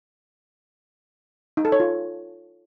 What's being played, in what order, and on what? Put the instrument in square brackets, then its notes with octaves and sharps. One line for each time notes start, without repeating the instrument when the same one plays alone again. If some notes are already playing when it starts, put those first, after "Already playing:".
[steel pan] D#4
A4
C#5
F4